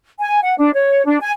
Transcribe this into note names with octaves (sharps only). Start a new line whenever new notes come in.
G#5
F#5
D4
C#5
D4
G#5